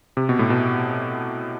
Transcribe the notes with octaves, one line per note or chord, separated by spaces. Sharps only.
C3
B2
A2
B2